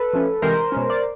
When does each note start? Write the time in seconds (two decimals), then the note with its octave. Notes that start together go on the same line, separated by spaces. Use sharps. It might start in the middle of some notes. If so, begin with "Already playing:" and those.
Already playing: A4 B4
0.13 F3 A3 C#4
0.42 C3 E3 G#3 C4 A#4 C5
0.72 B2 G#3 C#4
0.90 D5